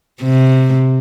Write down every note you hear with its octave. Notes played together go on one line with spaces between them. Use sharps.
C3